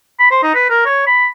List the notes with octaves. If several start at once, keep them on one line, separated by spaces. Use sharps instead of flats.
B5
C5
D#4
B4
A#4
C#5
B5